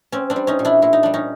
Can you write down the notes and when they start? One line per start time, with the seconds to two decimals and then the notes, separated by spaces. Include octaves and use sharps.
0.12 C4 C#4
0.30 C4 D4
0.36 G3
0.47 C#4 D#4
0.59 A#2
0.65 D4 E4
0.82 A#2 E4
0.93 D#4
1.03 G3 D4
1.14 C#4 D#4